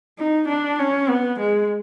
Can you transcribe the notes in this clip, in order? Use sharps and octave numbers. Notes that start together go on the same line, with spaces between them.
D#4
D4
C#4
B3
G#3